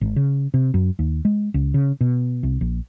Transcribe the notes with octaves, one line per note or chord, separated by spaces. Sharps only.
G#1
C#3
C3
F#2
D#2
G#3
C#2
C#3
B2
C2
A#1